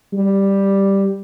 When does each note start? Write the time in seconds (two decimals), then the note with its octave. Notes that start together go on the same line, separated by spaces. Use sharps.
0.13 G3